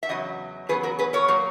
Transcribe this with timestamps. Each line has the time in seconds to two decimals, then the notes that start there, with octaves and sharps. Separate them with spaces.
0.03 E5
0.09 E2 C#3 F#3 D#5
0.69 E2 C#3 F#3 B3 G#4 B4
0.83 F#4 A#4
0.99 G#4 B4
1.13 A#4 C#5
1.28 A#2 F#3 A#3